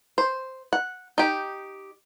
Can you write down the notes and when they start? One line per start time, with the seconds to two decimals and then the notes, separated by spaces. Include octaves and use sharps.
0.18 C5
0.73 F#5
1.18 D#4 G4